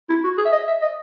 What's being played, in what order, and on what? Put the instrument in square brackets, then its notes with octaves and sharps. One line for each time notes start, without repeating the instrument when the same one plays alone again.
[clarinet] E4
F#4
G#4
E5
D#5
E5
D#5